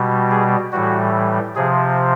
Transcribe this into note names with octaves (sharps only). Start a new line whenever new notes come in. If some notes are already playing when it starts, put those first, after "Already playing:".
Already playing: B2 G3
G#4
A2 E3 G3 F#4
C3 F3 G#4